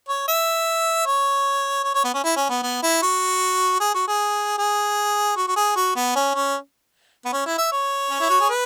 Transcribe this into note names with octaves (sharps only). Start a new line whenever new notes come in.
C#5
E5
C#5
C#5
C#5
B3
C#4
E4
C#4
B3
B3
E4
F#4
G#4
F#4
G#4
G#4
F#4
F#4
G#4
F#4
B3
C#4
C#4
B3
C#4
E4
E5
C#5
C#4
E4
F#4
G#4
B4